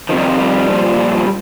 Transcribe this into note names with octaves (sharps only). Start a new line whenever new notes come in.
F2 C3 D#3 F3
G3
F3
G3
A#2 F3